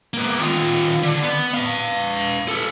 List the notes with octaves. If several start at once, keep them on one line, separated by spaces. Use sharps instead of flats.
A#3 B3
D#3 F4
D3
B3
B4 F5
A4 B4